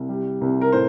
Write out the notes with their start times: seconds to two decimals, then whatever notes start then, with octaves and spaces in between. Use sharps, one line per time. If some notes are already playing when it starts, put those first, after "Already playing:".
Already playing: C2
0.09 G3
0.41 C2
0.61 A#4
0.72 A2 C5